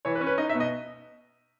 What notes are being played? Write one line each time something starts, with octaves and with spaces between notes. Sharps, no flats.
E3 C#5
B4
C#4
B4
D#4 D#5
E5
B2
D#5